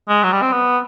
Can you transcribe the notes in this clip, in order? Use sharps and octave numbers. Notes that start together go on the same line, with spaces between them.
G#3
F#3
G3
C4
B3